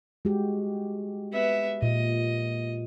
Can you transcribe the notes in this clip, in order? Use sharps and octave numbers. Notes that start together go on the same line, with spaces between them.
G#3 F#4 G4
B3 E5
A#2 D#5